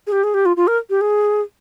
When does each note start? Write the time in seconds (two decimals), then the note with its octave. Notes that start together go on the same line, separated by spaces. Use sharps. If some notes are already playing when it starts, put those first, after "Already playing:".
0.07 G#4
0.12 G4
0.24 G#4
0.34 G4
0.46 F4
0.57 F4
0.67 A#4
0.90 G4
1.01 G#4